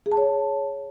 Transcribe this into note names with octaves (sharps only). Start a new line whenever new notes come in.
G#4
A5
C#5